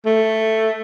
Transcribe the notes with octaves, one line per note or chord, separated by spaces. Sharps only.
A3